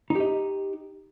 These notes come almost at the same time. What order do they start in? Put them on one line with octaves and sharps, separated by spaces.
D#4 G4 D#5